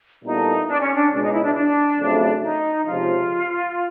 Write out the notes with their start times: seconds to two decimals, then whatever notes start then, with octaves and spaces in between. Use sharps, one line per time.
0.23 A#2 G3 B3 D#4 E4 A4
0.67 D4
0.80 C#4
0.93 D4
1.11 C#2 B2 G#3 D4
1.21 D#4
1.32 E4
1.44 D4
1.54 D4
1.98 F2 C#3 F#3 A3
2.42 D#4
2.85 C#2 C3 F3 F4